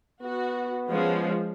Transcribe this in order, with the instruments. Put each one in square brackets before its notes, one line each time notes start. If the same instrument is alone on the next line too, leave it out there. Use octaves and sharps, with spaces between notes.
[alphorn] B3 [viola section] F#4
[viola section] F3 G#3 C#4